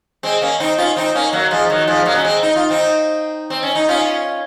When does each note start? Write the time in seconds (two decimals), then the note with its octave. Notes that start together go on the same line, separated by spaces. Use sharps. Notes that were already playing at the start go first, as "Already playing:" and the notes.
0.23 G#3 C4
0.42 A#3 C#4
0.60 C4 D#4
0.78 C#4 F4
0.96 C4 D#4
1.15 A#3 C#4
1.33 F#3 A#3
1.51 F3 G#3
1.70 D#3 F#3
1.87 F3 G#3
2.06 F#3 A#3
2.15 C#4
2.25 G#3 C4
2.43 D#4
2.56 F4
2.70 C4 D#4
3.50 C4
3.63 C#4
3.75 D#4
3.89 C#4 F4